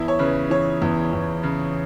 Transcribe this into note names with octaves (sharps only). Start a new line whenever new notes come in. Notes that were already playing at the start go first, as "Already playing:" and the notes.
Already playing: E2 E4
C#5
C#3 B4
E3 C#5
E2
E2
C#3